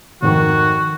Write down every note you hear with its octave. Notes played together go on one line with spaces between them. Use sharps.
F1 G#2 D#3 F#4 C#6